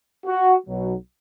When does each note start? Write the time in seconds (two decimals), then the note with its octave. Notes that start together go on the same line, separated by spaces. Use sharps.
0.26 F#4
0.67 B1 B2 F#3